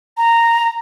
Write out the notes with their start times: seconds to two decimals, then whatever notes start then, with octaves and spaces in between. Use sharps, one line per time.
0.17 A#5